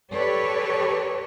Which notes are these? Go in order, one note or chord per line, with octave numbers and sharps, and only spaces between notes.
G4 A4 B4 C#5 D5